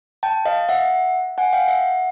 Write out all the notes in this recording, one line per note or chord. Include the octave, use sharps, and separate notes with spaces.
G5 A5
D#5 F5
E5 F#5
F#5 G#5
F5 G5
E5 F#5